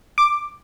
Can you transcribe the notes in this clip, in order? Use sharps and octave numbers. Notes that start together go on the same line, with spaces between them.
D6